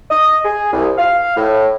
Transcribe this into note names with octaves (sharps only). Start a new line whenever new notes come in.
D#5
G#4
C2
F5
A2